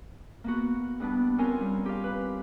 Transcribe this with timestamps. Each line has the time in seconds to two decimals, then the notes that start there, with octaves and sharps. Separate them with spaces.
0.44 A#3 B3 F#4
1.00 G2 B3 D4
1.38 C4 C#4 F4 A#4 G#5 C6
1.60 G3
1.86 G4 F5
2.04 B4